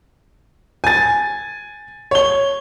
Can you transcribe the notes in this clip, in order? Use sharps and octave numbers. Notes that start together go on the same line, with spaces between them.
G#5 A6
C#5 G7